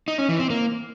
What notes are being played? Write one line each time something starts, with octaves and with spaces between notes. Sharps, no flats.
D#4
C#4
E3
C4
A#3